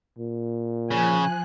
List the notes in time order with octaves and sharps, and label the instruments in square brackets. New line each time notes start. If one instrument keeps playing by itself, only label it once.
[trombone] A#2
[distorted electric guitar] C#3 [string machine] F3 F#6 [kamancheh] G#5